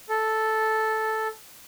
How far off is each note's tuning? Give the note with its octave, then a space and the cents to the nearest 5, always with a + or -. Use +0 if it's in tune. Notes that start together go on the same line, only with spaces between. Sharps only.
A4 -5